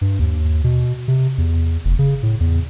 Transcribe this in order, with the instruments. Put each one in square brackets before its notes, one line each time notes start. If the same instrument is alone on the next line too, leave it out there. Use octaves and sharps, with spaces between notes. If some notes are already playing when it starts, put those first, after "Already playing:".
[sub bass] G2
D#2
B2
C3
E2
F1
C#3
A2
E2